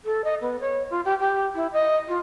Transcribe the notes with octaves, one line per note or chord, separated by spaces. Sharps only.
A4
D#5
B3
C#5
F4
G4
G4
E4
D#5
F4